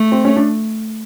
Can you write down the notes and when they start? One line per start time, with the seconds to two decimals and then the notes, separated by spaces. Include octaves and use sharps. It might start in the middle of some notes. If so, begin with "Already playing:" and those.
Already playing: A3
0.12 C4
0.25 C#4
0.36 D4